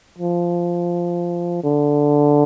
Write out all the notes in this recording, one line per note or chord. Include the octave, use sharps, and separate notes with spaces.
F3
D3